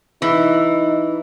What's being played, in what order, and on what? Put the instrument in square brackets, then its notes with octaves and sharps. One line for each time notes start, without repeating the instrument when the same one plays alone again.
[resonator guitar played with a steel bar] E3 [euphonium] D#4